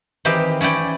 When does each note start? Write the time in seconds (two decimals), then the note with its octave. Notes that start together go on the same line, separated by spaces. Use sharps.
0.25 D#3 E3 C4 G4
0.61 C#4 E4 D5 G5